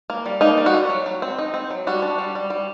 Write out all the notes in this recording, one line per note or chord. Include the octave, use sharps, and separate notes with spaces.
A#3
G3
A#3 D#4
G3
F#4
G3
F#3
F#3
C4
D#4
C4
F#3
G3 F#4
D4
G3
G3
G3